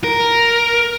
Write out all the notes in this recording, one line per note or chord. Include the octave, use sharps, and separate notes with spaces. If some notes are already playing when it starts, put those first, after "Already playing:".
A#4